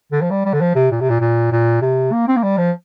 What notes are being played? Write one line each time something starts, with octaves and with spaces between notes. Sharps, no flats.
D3
F3
G3
G3
D3
F3
C3
A#2
C3
A#2
A#2
A#2
C3
A#3
C4
A#3
G3
F3